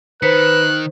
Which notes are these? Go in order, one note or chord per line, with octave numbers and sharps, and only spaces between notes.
D#3 B4 C5 F#6 B6 C#7